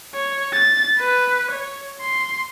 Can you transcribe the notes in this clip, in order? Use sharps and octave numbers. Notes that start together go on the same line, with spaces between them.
C#5
A6
B4
C#5
C6